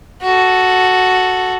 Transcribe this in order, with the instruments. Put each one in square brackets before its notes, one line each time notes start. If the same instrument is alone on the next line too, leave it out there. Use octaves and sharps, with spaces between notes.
[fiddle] F#4 A4